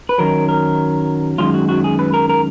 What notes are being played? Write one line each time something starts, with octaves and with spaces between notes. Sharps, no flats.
B4
F#2 D#3 F#3 A#4
A#4
F#2 D#3 G#3 F4
F#4
F#4
G#4
B4
A#4
A#4